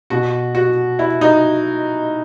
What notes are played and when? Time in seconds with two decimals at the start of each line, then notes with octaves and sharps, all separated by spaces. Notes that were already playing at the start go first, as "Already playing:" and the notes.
0.10 B2 F#4
0.55 F#4
0.99 E4
1.21 D#4